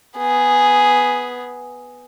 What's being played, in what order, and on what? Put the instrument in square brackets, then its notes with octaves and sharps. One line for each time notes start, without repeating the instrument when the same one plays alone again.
[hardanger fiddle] B3 G#4